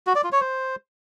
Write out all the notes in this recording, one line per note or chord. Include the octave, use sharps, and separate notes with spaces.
F#4
D5
F4
C#5
C5